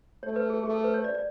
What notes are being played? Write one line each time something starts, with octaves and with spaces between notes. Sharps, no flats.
A3 C#5
B4
G#4
A3 G#4
A4
B4
C#5
D5
D5